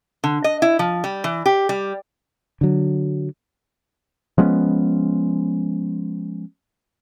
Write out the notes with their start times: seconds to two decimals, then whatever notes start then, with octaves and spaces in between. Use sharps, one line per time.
0.24 D3
0.44 D#5
0.62 E4
0.79 F3
1.04 G3
1.24 E3
1.46 G4
1.69 G3
2.61 D3 F#3
4.38 F3 G#3 B3 C#4